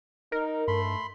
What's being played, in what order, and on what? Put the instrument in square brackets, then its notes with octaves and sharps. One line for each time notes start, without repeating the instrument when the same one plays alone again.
[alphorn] D#4 [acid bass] A#4
[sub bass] G2 [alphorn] A3 [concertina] B5 C6